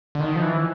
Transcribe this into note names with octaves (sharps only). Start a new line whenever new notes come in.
D3
D#3
F3
E3